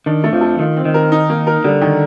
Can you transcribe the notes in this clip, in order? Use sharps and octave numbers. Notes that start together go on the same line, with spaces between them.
D#3 D4
A3
F2 F3
A4
D#3 F4
C4
D#3
A#4
D#4
A#3
A#4
D3 G3
D#3